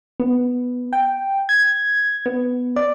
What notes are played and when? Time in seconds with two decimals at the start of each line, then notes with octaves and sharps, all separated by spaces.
0.20 B3
0.93 G5
1.49 G#6
2.26 B3
2.76 D5